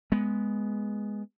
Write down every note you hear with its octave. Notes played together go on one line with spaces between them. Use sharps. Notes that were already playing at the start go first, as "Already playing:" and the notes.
G#3 B3